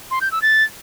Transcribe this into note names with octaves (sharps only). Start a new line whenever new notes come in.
C6
G6
E6
A6